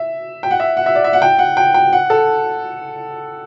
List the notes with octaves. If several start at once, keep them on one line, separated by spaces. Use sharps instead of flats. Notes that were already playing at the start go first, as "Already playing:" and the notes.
Already playing: E5
G5
F#5
E5
F#5
E5
D5
E5
F#5
G5
F#5
G5
G5
F#5
A4